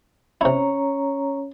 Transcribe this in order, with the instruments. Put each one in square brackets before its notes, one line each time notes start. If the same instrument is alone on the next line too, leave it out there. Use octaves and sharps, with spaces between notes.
[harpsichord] C3 E4 [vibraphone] C#4 C#5 A#5